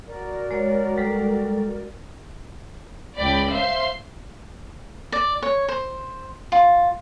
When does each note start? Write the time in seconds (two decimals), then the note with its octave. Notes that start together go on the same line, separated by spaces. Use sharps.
0.07 F#4 A#4 D5
0.51 G#3 C#5 G#5
0.98 G3 G#3 A4
3.18 C#2 D5 G5 B5
3.52 C5 E5 F5 C6
5.12 D5
5.42 C#5
5.69 C5
6.52 F4